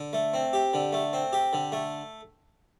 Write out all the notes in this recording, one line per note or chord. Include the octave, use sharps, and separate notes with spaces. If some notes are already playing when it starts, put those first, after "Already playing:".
Already playing: D3
A3
C4
G4
D3
A3
C4
G4
D3
A3